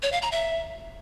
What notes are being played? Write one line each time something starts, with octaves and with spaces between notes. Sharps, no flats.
C#5
F5
A#5
E5